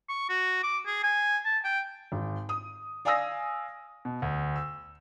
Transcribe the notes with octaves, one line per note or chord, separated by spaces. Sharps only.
C#6
F#4
D6
G#4
G#5
A5
G5
G#1
D#6
D5 F5 G#5 D#6 E6 A#6
B2
D2
E6